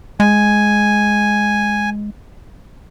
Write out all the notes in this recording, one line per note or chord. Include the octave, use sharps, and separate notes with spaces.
G#3 G#5